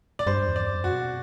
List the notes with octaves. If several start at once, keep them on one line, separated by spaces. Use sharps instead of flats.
D5
G2 C5
E2
D5
F#2
F#4
B2